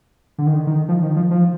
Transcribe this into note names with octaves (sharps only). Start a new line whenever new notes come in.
D3
D#3
D#3
F3
D#3
F3
F3